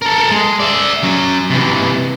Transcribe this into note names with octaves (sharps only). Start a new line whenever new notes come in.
A4 A#4
G#3
D5 E5
F#3 C#4
C3 E3